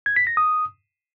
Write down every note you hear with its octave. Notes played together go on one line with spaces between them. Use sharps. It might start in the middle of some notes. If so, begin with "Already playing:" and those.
G#6
B6
A#6
D#6